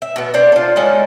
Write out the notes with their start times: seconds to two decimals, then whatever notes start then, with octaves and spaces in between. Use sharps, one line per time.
0.02 E5
0.16 B2 B3
0.34 D4 C5 D5
0.52 F4 A4
0.76 G#3 C#4 D#4 A4